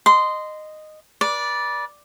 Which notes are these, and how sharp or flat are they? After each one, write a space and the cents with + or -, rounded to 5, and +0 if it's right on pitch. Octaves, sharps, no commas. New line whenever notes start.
D#5 -10 C6 -15
B4 -35 D5 -5